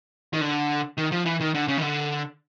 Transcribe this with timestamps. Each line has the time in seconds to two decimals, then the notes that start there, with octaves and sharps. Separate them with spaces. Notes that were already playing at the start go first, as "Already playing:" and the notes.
0.33 D#3
0.41 D3
0.98 D#3
1.12 F3
1.26 E3
1.40 D#3
1.54 D3
1.68 C#3
1.77 D#3
1.82 D3